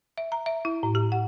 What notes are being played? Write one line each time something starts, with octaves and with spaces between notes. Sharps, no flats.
E5
A#5
E5
E4
A2
G4
F#5